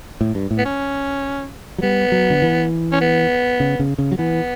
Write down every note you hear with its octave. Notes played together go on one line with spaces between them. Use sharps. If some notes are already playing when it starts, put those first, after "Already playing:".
A2
G2
A2
B3
C#4
F#3
G3 B3
F#3
D3
E3
C#4
B3
C#3
C#3
C#3
F#3
E3 B3